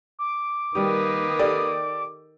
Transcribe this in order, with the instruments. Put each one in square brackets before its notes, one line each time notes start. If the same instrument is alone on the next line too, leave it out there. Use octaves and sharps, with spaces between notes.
[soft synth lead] D6
[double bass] D#3 [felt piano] G3 G4 [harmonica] A#3 B4 D#6
[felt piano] G4 A4 D5